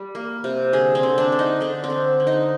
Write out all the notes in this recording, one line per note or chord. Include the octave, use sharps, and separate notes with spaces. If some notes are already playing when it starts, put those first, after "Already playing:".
Already playing: G3
A#3
C3
D3 G#4
C4
D3
D4
D3
D#4
D3 D4
C4
D3
D3
D#4